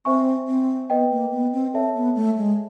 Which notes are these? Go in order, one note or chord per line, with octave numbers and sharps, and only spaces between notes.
C4 C5 E5 G#5 C#6
C4
B3 B4 D#5 G5
A#3
B3
C4
C4 A4 C#5 E5 A5
B3
A3
G#3